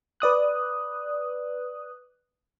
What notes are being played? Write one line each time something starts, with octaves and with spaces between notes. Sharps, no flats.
B4 D5 D#6 F#6